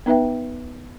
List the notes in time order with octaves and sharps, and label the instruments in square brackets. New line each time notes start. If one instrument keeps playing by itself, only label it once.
[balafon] B3 D#4 B4 E5 G5